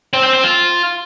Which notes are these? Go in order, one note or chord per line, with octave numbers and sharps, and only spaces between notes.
C4
C4
C4
F4